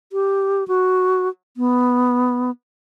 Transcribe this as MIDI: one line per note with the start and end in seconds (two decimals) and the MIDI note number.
0.12 0.67 67
0.68 1.29 66
1.57 2.51 59